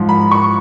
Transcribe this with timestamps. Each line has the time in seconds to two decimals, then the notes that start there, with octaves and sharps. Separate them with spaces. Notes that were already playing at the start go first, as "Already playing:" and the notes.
Already playing: G#2 F3
0.09 B5
0.31 C#6